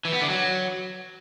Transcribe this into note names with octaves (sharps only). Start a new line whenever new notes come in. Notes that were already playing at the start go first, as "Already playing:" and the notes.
E3
B3
D3
F#3